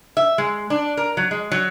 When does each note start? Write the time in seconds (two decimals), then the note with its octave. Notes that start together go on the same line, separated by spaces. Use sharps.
0.17 E5
0.38 G#3
0.70 D4
0.97 A#4
1.17 F#3
1.31 G#3
1.52 F#3